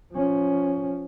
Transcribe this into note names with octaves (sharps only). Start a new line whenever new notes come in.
F3 C#4